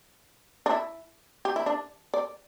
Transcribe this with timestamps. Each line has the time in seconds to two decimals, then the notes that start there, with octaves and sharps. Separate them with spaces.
0.66 D4
0.70 E4
1.45 G4
1.56 E4
1.66 D4
2.14 D5